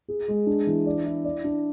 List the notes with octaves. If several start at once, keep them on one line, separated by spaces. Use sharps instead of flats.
G#4
G#3
D4
E3
D5
E4
D5
D4